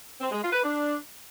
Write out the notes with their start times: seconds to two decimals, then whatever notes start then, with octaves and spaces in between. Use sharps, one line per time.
0.21 C4
0.31 G#3
0.42 F4
0.53 B4
0.63 D4